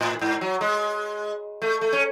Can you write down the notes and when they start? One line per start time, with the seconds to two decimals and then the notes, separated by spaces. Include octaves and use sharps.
0.01 A2
0.21 G#2
0.41 F#3
0.61 G#3
1.62 A3
1.81 A3
1.93 C#4